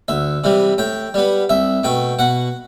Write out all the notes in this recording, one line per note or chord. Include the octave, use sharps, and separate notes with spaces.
D2 E5
C3 E3 G3
A2 G5
G3 B3
C2 E5
B2 A3 G5
B2 F#5